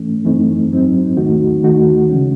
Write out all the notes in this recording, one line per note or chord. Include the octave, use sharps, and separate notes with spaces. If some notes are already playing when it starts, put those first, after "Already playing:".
Already playing: G#2 E3 A3 C#4
F#2 E3 A3 C4 D#4
G#2 F#3 C4 D#4
E2 D#3 A3 D#4 F#4
D#2 D#3 A3 D#4 F#4
C#3 E3 G#3 C#4